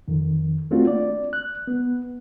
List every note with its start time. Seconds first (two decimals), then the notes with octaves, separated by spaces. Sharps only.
0.08 F2 D#3
0.71 A3 A#3 C4 D4 F4 F#4
0.87 D5
1.33 F#6
1.67 B3